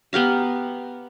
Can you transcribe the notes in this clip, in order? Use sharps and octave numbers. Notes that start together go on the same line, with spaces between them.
B3 G4 F5 A#5